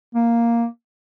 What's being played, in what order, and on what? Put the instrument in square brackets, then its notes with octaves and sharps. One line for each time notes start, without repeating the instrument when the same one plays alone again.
[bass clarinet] A#3